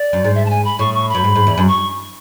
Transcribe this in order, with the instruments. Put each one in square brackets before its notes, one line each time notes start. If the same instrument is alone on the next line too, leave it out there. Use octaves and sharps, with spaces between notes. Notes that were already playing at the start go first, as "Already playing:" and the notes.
Already playing: [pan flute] D5
[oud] F#2
G#2
[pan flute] E5
A5
G#5
B5
[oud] A2 [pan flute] C#6
[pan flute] C#6
B5
[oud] F#2
G#2
G#2
E2
F#2
[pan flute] C#6